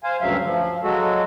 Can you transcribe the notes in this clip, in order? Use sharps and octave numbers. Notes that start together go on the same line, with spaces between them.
C5 F5 G#5
D2 G2 C#3 F#3 E5 F5
F3
F#3 G#3 F#4 A4